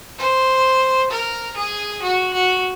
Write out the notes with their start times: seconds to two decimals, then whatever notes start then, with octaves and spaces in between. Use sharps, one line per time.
0.18 C5
1.10 A#4
1.56 G#4
2.02 F#4
2.33 F#4